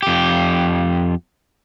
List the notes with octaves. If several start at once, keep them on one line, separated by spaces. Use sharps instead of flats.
F2 G4